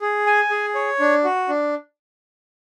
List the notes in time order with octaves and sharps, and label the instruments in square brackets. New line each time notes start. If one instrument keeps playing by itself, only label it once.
[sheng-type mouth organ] G#4
G#5
G#4
C#5
D4
F#4
D4